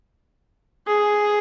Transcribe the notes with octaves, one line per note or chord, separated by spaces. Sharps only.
G#4